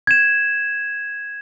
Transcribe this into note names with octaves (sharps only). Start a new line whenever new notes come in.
G#6 E7